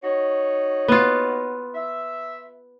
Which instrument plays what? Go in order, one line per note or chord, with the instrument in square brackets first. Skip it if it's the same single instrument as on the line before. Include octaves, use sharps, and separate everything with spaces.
[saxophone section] D#4 F#4 C#5
[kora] B3 F4
[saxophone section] E5